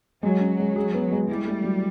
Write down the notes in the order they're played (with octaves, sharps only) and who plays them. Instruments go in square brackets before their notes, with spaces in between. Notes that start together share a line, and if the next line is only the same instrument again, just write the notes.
[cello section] F#3 [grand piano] G#3
[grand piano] C#4
G#3
G#4
B3
G#3
[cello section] G3 [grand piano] E4
[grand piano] A3
F#3